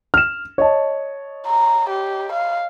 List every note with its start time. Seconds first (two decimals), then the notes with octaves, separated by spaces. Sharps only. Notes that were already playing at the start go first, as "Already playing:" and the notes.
0.14 F6 E7
0.58 C#5 D#5 A5
1.48 A#5
1.89 G4
2.33 F5